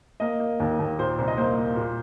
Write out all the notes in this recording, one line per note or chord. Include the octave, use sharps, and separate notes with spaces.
A#3 D#5
A#3
D#2
D#2
A#2 C5
C2 C5
D#5
A#3 C5
A#3
A#2